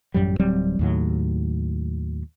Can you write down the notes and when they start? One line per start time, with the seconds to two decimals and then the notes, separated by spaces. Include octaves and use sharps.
0.14 A1 F#2 F#3 G3
0.40 D1 F#3 G3 C4
0.79 D#2 A2 F#3